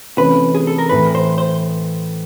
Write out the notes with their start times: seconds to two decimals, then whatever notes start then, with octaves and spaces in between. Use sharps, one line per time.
0.17 C3 E3 A3 C#4 B4
0.55 G#4
0.67 A4
0.78 A#4
0.89 A2 E3 A3 B4
1.15 C5
1.38 C5